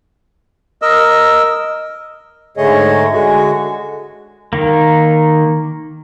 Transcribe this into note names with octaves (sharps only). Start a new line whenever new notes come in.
A#4 D#5 E6
G#2 D3 A3 G#4 C#5 D#5
D3 G#3 F#4 G#4
D#3 A#3